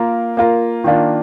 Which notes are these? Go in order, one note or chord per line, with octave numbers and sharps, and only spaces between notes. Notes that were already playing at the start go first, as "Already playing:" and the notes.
Already playing: A#3 F4 A#4
A#3 F4 A#4
D#3 A#3 D4 F4